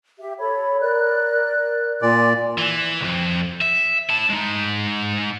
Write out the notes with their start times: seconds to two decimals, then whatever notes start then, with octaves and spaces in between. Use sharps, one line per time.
0.19 G4 E5
0.39 A4 C#5 B5
0.80 A#4 D5 F#6
2.02 A#2 D5 G#5 C6 D6
2.58 E3
3.01 C2 F2
3.61 E5
4.10 E4 A5
4.30 G#3 D#4